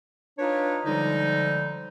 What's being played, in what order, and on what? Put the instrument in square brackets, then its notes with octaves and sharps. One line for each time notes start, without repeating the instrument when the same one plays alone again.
[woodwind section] D4 D#4 F4 B4 C#5
D3 F3 G3 G#3 D#4